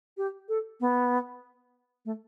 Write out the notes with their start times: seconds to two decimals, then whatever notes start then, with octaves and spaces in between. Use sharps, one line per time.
0.17 G4
0.49 A4
0.81 B3
2.05 A3